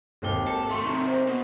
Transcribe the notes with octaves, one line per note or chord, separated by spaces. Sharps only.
G#1 D#2 G7
A4
A3 C6 C#6
C3 D#3
C5
B2 B3